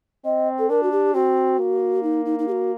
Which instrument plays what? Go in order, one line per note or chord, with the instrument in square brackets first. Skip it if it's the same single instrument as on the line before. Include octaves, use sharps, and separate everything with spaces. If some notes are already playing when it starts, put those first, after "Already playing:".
[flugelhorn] C4 [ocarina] D#5
[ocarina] A4
[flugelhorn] D4 [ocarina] A#4
[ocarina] F#4
G4
[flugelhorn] C4 [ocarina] F#4
[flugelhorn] A#3
[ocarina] D#4
D#4
D#4
G4
F#4